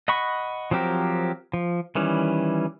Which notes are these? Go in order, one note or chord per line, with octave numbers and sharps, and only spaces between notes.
D#5 F#5 B5 C#6
F3 F#3 C4 G4 A#4
F3
D#3 E3 G3 C#4